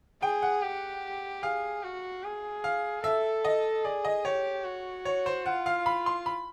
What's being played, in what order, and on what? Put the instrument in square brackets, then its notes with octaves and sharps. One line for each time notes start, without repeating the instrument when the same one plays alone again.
[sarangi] G#4 [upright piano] G5
[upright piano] F#5
[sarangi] G4
[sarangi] G#4 [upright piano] F5
[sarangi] F#4
G#4
[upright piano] F5
[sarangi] A4 [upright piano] E5
[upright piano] D#5
[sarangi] G#4 [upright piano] D5
[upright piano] D#5
[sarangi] G4 [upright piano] C#5
[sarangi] F#4
[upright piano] C#5
C5
[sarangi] F4 [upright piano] F#5
[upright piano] F5
B5
C6
B5